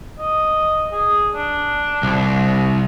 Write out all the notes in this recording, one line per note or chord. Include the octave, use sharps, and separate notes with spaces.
D#5
G#4
D4
C2